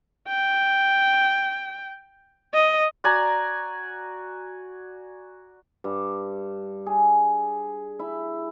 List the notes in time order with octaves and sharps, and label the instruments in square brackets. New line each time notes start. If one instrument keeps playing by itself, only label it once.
[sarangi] G5
D#5
[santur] F#4 D5 G#5 A#5
[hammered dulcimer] G2
G#4
E4